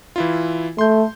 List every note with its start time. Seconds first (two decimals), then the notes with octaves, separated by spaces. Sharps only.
0.16 E3 E4 F4
0.78 A3 C6 G6